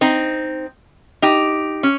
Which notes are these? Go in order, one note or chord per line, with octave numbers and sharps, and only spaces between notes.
C4 D#4
D#4 G4
C#4